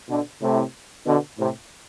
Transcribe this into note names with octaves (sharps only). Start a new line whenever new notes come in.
B2 D3
A2 C3
B2 D3
A2 C3